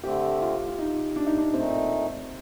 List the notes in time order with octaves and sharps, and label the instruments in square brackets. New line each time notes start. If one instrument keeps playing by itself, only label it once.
[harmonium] D3 A3 C4 [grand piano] G4
[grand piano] F4
F4
D#4
D4
D#4
D4
[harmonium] A#2 A3 D#4 [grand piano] C4